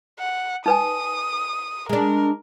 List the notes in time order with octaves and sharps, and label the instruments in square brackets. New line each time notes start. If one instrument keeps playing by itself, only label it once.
[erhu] F#5
[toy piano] D#4 B4 G#5 [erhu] D#6
[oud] G#3 D4 [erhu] A#4